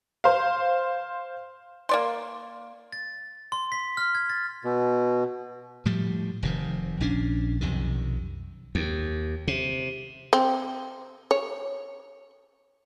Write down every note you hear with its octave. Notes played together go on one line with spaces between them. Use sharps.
C5 F5
A#3 D5 C6
A6
C6
B6
F6
G#6
A6
B2
A2 F3 G3
F1 C3 D#3
A#1 C#4 D4
B1 F2 C3 D#3
D#2
C3
C4
C#5